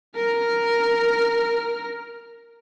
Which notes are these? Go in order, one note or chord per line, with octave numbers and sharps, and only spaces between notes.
A#4 F6